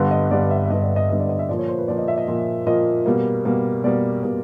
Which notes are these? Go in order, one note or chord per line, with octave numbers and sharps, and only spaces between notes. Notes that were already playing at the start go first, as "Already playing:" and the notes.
Already playing: G2 D3 G3 B3
D#5
G2 D3 G3 B3 D5
E5
E5
G2 D3 G3 B3 D#5
D5
D#5
G2 D3 G3 B3 D#5
D5
D#5
E5
A#2 F3 A#3 D5
C#5
C5
B4
A#2 F3 A#3 D5
D#5
E5
D#5
A#2 F3 A#3
A#2 F3 A#3 D#5
B2 G3 A#3
B2 G3 A#3
B2 G3 A#3 D5
B2 G3 A#3